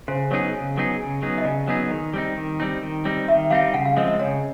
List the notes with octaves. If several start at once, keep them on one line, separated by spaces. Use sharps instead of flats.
C#3 C5
F#3 B3 D#4 G#4 C#5
C#3
F#3 B3 D#4 G#4
C#3
F#3 B3 D#4 G#4
D#5
C#3 D5
F#3 B3 D#4 G#4
D#3
G3 C4 D#4
D#3
G3 C4 D#4
D#3
G3 C4 D#4
D#3 E5
G3 C4 D#4 F5
C#3 F#5
F5
F3 G#3 C4 D#5
D#5
C#3 C#5